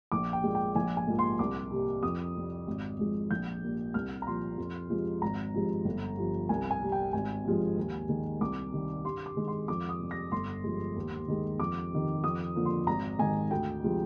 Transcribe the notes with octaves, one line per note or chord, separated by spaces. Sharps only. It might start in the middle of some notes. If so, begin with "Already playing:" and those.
A#1 D6
G5
A#2 G#3
G5
A#1 G#5
G#5
G#2 F3 A#3
C6
C2 D6
C3 G3 A#3
F2 D#6
C3 G3
G#1
G#2 F3 G#3
A#1 G6
A#2 G3 A#3
C2 F6
A#5
A#2 F3 C6
F2
C3 F3 G#3
G#1 A#5
G2 F3 G#3
G1
G2 F3
C2 G#5
G#5
C3 G3
G5
G#1 G#5
G2 F3 G#3
D#2
D#3 G#3
C2 D6
C3 D#3 G3
G2 C6
D6
D#3 G#3
C6
F2 D6
D#6
C3 G3
A#6
G1 C6
G2 F3 G#3
D#2
D#3 G#3
F2 D6
C3 D#3
F2 D#6
D3 F3 A#3
C6
G#1 A#5
G#2 D#3 G#5
D2 G5
C3 F3 G#3